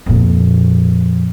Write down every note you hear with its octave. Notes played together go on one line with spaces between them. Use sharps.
F2 A#2